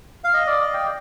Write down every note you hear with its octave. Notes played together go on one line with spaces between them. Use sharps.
F5
D#5
D5
D#5
G5